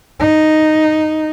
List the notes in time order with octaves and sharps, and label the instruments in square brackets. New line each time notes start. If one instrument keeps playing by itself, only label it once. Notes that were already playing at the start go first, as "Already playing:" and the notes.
[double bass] D#4